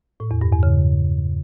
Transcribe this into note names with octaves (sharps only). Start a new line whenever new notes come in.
A2
E2
G2
E2
C#3